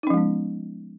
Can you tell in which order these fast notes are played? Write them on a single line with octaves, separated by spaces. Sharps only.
D#4 C#4 F3 G#3 B3